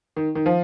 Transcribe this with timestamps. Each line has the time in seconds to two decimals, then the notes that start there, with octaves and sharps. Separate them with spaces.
0.16 D#3
0.35 D#3
0.46 F3